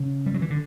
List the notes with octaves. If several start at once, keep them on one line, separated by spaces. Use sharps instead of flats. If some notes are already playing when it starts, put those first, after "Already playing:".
Already playing: C#3
G3
F#3
E3
D3